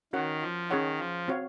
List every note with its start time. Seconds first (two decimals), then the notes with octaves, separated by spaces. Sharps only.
0.13 D#3 C#4 F#4 A#4 C#5 F#5
0.42 F3
0.70 D#3 C#4 G#4 C#5 F#5
0.99 F3
1.28 C4 F#4 C#5 F5